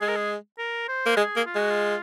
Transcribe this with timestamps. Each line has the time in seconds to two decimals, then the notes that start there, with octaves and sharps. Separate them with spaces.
0.01 G#3 G#4
0.08 A#4
0.16 G#4
0.58 A#4
0.88 C5
1.06 A#3
1.17 G#3 G#4
1.36 A#3
1.46 F4
1.55 G#3 F#4
1.71 F4